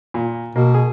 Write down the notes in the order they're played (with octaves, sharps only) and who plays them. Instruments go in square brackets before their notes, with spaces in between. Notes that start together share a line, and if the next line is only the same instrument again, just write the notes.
[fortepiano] A#2
[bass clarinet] B2 [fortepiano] A#3
[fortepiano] G#4